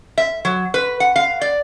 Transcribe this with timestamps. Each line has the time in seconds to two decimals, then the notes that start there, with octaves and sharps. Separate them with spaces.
0.18 E5
0.45 F#3
0.74 B4
1.00 F#5
1.16 F5
1.41 D5